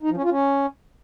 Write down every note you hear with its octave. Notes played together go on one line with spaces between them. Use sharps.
D#4
F3
C#4
F4
C#4